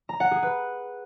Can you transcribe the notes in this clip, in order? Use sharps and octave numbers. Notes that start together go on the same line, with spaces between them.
A#5
F#5
G#4
B4